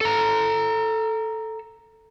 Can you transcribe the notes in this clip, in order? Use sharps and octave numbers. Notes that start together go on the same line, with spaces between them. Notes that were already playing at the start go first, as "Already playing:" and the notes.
A4 A#5